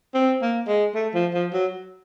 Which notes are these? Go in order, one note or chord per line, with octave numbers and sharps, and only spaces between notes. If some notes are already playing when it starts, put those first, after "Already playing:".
C4
A#3
G#3
A3
F3
F3
F#3